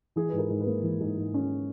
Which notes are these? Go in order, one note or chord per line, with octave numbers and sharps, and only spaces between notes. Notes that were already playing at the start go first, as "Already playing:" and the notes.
E3 G#4
G#2 B4
A#4
G#2
B4
A#3
E3
G#2
G#2
C#4